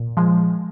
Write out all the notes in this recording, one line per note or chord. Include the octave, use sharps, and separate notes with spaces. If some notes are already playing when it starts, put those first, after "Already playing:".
Already playing: A#2
F3 G#3